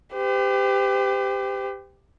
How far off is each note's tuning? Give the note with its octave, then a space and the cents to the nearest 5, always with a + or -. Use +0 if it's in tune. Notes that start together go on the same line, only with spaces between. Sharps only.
G4 +15 C5 -45